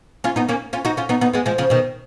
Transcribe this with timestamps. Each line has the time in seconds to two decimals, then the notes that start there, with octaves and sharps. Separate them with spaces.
0.24 C#4 F4
0.36 B3 D#4
0.49 A#3 C#4
0.73 C#4 F4
0.85 D#4 F#4
0.97 C#4 F4
1.09 B3 D#4
1.21 B3 D#4
1.33 G#3 B3
1.46 F3 G#3
1.58 C#3 F3
1.70 B2 D#3